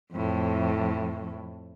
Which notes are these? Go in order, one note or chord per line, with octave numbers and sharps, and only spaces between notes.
F2 A2